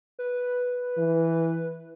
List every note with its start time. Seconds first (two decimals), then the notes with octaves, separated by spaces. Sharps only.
0.19 B4
0.98 E3